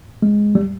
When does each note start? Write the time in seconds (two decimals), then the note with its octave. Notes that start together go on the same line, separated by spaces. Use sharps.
0.22 G#3
0.55 G3